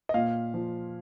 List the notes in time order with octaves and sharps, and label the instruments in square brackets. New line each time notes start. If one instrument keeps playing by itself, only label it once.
[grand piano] D#5
A#2 F5
F3